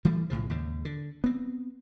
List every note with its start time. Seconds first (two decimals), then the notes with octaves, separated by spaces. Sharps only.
0.05 E3 G3 A3
0.30 B1 A2 C#3 F3
0.50 D#2 G#2 C#3
0.85 D3
1.24 B3 C4